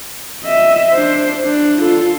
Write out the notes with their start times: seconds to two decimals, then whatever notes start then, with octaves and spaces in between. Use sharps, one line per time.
0.41 D#5 E5
0.91 D4 C5
1.43 D4
1.81 F4 A4